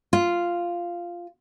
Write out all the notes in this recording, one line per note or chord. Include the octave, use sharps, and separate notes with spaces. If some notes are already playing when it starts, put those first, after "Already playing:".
F4